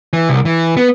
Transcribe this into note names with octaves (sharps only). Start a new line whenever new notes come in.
E3
C2
E3
B3